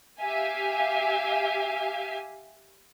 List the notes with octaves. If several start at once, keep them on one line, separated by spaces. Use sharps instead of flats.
G4 E5 F5 G#5